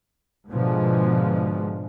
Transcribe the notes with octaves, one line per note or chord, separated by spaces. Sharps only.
G#2 B2 D3 F3 G#3